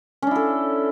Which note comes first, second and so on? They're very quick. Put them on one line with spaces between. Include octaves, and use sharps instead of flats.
C#4 D4 E4 A4